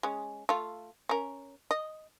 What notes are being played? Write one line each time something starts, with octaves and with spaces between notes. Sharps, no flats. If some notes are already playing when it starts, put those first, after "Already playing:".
G#3 C#4
A3 F4
C#4 A#4
D#5